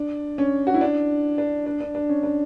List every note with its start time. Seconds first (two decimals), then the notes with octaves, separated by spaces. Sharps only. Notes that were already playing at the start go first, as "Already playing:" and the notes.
Already playing: D4
0.38 C#4
0.67 F#4
0.74 E4
0.81 D4
1.38 D4
1.66 D4
1.80 D4
1.95 D4
2.09 C#4
2.23 D4